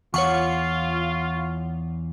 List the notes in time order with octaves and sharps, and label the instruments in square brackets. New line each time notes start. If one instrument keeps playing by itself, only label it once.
[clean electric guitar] E2 [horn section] F4 [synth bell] C#5 F#5 C#6